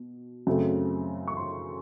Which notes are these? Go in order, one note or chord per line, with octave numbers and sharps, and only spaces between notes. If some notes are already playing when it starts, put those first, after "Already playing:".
Already playing: B2
F#2 C#3 F#3 A3 C4
C#6
C6